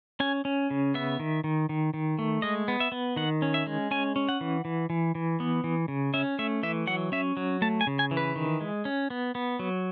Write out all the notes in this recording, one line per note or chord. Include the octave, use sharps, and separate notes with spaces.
C#4 G#5
C#4
C#3
B3 E5
D#3
D#3
D#3
D#3
A3
G#3 D#5
B3
E5
B3
D#3 F#5
C#4
E5
G#3
C#4 G#5
C#4
F#5
E3
E3
E3
E3
B3
E3
C#3
C#4 E5
A3 E5
E3 E5
F#3 F#5
C#4 E5
F#3
A3 A5
G#5
C#3
G#5
E3
B4
D#3
G#3
C#4
B3
B3
F#3